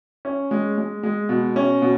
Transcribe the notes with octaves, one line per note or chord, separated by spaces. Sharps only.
C#4
G#3
G#3
G#3
B2
C#4
B2